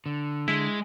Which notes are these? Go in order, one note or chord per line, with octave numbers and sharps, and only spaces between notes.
D3
G#3 E4